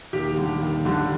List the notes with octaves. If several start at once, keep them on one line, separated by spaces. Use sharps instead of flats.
D#2 G4
D3 G3
D#2
D3 G3